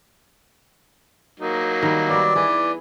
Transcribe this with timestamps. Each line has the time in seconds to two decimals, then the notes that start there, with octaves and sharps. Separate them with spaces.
1.40 F#3 A#3 D#4
1.83 D#3 G3
2.09 G3 B3 D5
2.35 E3 E4 G#4